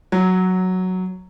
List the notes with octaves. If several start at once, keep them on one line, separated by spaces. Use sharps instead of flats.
F#3